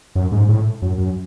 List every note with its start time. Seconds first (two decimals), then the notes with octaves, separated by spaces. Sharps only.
0.15 F#2
0.32 G#2
0.49 A2
0.82 F#2
0.98 F#2